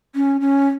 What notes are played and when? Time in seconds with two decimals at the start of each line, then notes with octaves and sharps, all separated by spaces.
0.15 C#4
0.41 C#4